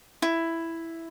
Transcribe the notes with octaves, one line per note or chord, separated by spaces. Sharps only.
E4